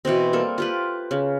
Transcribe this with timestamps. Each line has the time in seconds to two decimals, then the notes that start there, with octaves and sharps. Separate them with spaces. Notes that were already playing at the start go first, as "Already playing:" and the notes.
0.05 B2 E3 B3 C4
0.33 G3 A#3 A4
0.58 F4 G4 B4
1.11 C#3